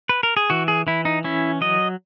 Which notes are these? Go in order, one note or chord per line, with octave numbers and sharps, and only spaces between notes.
B4
A#4
G#4
E3 F#4
G#4
E3 E4
D#4
C#4 E4
F#3 D#5